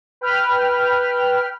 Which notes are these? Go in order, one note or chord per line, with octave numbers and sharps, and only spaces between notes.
B4 G5 B5 F6